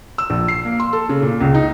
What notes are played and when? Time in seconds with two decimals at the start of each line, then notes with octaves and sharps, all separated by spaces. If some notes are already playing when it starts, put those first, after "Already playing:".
0.18 E6
0.30 A#1
0.48 C7
0.65 A#3
0.80 C6
0.93 A4
1.09 C#3
1.22 A#2
1.41 C#2
1.54 D#4